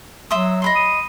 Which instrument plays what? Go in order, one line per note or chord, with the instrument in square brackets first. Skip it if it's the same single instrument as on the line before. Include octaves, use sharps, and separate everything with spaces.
[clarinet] F#3 [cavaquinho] E5 C6 D#6
[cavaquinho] D#5 B5 C6
[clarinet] D#6